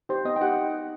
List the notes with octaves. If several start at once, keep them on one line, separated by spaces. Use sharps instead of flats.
D#4 G4 C5
B3 D#5
G5
D#4 G4 F#5